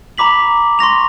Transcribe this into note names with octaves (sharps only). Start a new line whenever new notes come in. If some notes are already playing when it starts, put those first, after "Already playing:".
A#5 B5 D6 B6 F#7
C6 C#6 A#6 F7